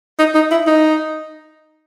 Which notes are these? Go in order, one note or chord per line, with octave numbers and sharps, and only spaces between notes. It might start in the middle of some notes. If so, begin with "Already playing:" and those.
D#4
D#4
E4
D#4